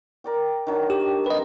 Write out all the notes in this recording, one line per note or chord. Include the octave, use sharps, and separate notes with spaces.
A#4 D5 G5
D#3 F#3 D4
G4
G3 C4 B4 D#5